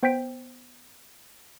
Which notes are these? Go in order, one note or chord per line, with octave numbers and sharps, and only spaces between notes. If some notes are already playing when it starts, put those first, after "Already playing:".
B3 C5 G5 G6 B6 D7